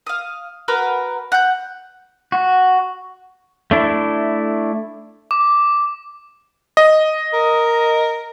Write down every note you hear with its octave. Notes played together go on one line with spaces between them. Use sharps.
F5 D#6
F#4 A#4 B4
F#5 G6
F#4
A3 D4 E4
D6
D#5
A#4